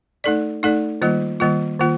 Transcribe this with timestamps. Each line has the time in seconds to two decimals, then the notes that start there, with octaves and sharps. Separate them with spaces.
0.24 A3 D#4 A4 D5
0.63 A3 D#4 A4 D5
1.02 D#3 G3 A#3 F4
1.40 D#3 G3 A#3 F4
1.80 D#3 A#3 F4